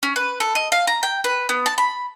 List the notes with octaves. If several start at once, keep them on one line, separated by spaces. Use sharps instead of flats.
C#4
B4
A4
D#5
F5
A#5
G5
B4
B3
A5
B5